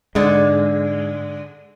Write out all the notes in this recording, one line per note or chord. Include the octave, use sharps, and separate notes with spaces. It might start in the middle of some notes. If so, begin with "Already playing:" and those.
G#2 D3 G#3